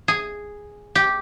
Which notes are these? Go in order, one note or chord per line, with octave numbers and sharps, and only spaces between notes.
G#4
G4